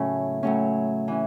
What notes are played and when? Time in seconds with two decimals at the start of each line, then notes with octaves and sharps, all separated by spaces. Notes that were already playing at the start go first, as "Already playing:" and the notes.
Already playing: A2 C#3 F#3 A3 C#4
0.43 A2 F#3 C#4
1.08 E3 C#4